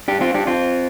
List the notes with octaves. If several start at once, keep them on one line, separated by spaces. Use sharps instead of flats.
D4 G4
C4 F4
D4 G4
C4 F4